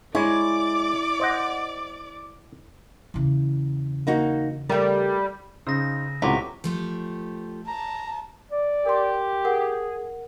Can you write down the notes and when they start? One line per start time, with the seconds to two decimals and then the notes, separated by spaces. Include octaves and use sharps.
0.15 G#3 E4 C#5 D5 D6
1.20 C5 D#5 F#5
3.14 E2 C#3
4.07 A#3 D#4 F#4
4.69 G3 A3 A#4
5.67 C#3 D#4 C5 E6 A#6
6.22 C#2 A2 C3 E3 F#3 C#6 D6 B6
6.64 F3 A3 G4
7.68 A5 A#5
8.51 D5
8.86 G4 A#4 C6
9.45 G#4 A#4 F#5